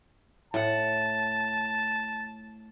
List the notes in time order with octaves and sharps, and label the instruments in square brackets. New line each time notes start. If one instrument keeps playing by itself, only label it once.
[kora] A2 F#5 [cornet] A5